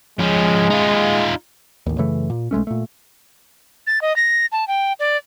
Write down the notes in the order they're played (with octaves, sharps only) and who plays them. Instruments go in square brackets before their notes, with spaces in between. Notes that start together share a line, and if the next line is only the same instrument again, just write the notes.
[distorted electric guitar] F3 C#4 [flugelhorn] G#3
[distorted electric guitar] D#4 F4
[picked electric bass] A1 D#2
F#2 C#3 E3 A3
A#2
B1 G#3 A3 C#4
A#2 A3
[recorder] A6
D#5
A#6
A5
G5
D5